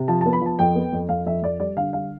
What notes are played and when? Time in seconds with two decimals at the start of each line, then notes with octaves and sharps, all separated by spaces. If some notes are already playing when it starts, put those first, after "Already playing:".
Already playing: C3
0.08 F3 A5
0.21 A5
0.26 B3
0.33 B5
0.41 F3 A5
0.59 F2 G5
0.75 B3
0.93 F2
1.09 F2 F5
1.26 F2 E5
1.43 F2 D5
1.60 G3 D5
1.77 D3 F5
1.93 G3 F5